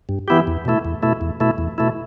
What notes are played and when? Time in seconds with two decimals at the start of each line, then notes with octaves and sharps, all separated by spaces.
0.09 G2
0.28 E3 B3 E4 G4
0.47 E2
0.65 B2 A3 E4
0.85 E2
1.02 B2 A3 E4
1.21 E2
1.40 B2 A3 E4
1.58 E2
1.78 B2 A3 E4